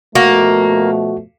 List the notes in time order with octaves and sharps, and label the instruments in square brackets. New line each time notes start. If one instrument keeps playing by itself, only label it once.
[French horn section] B2 F3 A3 [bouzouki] A#3 [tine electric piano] F#4